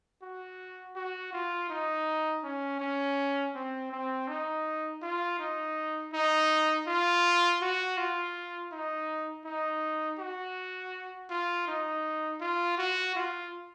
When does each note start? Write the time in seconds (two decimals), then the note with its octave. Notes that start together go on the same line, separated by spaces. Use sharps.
0.22 F#4
0.96 F#4
1.33 F4
1.70 D#4
2.44 C#4
2.80 C#4
3.55 C4
3.92 C4
4.28 D#4
5.02 F4
5.39 D#4
6.13 D#4
6.87 F4
7.61 F#4
7.97 F4
8.72 D#4
9.45 D#4
10.19 F#4
11.30 F4
11.68 D#4
12.40 F4
12.78 F#4
13.15 F4